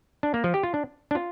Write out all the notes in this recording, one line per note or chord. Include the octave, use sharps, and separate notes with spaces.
D4
A#3
F3
G4
F4
D4
D4
F4